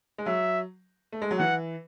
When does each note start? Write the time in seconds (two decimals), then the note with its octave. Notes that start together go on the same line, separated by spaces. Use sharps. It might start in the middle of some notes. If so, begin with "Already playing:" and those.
0.18 G#3
0.26 F#3 E5
1.12 A3
1.22 G#3
1.31 F#3
1.39 E3 F#5